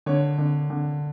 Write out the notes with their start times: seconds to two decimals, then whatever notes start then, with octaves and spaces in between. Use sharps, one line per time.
0.06 D3 C#5
0.38 D3
0.70 D3